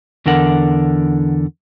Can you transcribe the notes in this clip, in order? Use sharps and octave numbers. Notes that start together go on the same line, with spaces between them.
E2 D3 D4 A#4 F#5